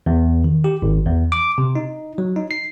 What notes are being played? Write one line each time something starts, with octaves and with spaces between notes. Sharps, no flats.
E2
D#3
G4
G#1
E2
D6
C3
D#4
F#3
D#4
C7